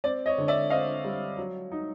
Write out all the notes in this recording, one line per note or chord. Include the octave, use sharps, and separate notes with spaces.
C4 D5
C#5 D#5
D3
D5 E5
C4 D#5 F5
G3
F#3
D#4